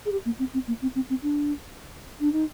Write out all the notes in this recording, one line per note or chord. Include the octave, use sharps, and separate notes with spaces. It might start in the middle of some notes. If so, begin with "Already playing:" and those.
G#4
G4
A#3
C4
C4
A#3
C4
C4
C4
D4
D4
D#4